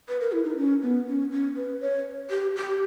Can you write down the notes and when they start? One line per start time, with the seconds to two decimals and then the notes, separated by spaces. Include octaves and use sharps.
0.08 B4
0.21 A#4
0.32 E4
0.45 D#4
0.57 C#4
0.83 B3
1.07 C#4
1.32 C#4
1.56 B4
1.81 C#5
2.30 G4
2.56 G4